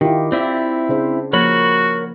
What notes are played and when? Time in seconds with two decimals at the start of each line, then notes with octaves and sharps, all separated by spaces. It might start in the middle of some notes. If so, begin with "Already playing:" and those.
0.01 D#3 E4 F4 G4
0.32 C4 E4 D5 E5
0.89 C#3 D4 C5
1.33 F3 A#3 F#4 A#4 C#5 B5